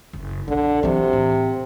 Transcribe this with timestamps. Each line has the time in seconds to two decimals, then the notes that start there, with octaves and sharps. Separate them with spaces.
0.13 F#1
0.48 B1 D3
0.83 C3 E3 F#3
1.13 A2